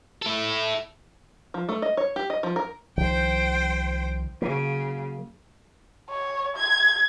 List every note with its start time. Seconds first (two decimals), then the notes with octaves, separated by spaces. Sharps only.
0.22 E4 A4
1.54 F3
1.69 A3
1.82 D#5
1.97 C#5
2.16 G4
2.30 D#5
2.43 F3
2.56 A#4
2.97 C2 D#3 F3 C5 G5
4.42 C#3 F#3 A#3
6.09 C#5
6.56 G#6